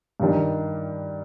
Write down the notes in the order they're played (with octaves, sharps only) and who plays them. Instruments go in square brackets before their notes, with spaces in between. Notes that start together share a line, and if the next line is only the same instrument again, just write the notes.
[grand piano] G2 D#3 G3 D4